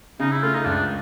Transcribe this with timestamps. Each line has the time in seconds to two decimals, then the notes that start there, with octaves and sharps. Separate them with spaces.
0.20 C#3 D#4
0.31 E4
0.43 A3 F4
0.54 D#4
0.65 C#2 D4